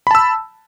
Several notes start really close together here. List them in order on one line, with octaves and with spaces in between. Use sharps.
B5 A5 E6